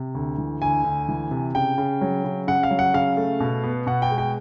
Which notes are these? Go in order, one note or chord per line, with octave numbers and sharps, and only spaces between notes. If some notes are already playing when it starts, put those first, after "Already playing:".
Already playing: C3
D2
E3
D2 G#5
D2
E3
C3
C#3 G5
C#3
F#3
C#3
C#3 F#5
F5
F#3
F#5
C#3 F5
A3
B2
B3
B2 F#5
G5
G#3
G5